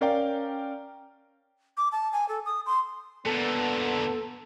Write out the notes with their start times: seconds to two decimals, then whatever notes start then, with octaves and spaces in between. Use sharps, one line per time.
0.01 C#4 A#4 D5 F5 G5
1.77 D6
1.92 A5
2.13 G#5
2.29 A4
2.46 D#6
2.66 C6
3.26 A#2 D3 B3 A4